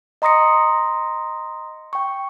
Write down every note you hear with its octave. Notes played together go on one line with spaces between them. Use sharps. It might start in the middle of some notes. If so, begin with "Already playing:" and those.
D#5 A#5 C6 D#6 A#6 C#7
G5 C#6